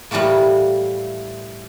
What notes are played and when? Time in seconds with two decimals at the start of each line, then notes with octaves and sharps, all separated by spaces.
0.11 A2 E3 G3 A3 A#3